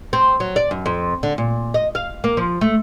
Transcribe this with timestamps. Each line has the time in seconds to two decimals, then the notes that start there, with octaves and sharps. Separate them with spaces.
0.13 C4
0.40 F#3
0.56 D5
0.71 F#2
0.86 F2
1.23 D3
1.38 A#2
1.74 D#5
1.95 F5
2.24 A#3
2.37 F3
2.61 A3